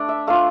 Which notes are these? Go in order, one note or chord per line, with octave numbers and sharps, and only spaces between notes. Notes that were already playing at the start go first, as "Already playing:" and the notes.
Already playing: A3 D4
E5
A3 D4 F4 F5